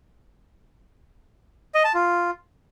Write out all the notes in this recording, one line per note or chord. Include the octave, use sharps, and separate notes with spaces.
D#5
A5
F4